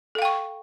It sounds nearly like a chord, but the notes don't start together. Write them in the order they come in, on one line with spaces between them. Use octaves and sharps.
A4 F5 G5 C#6